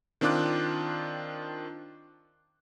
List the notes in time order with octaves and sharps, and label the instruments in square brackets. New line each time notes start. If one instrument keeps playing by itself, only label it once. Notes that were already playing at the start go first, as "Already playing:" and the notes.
[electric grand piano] D#3 C4 D4 F4 D6 F#6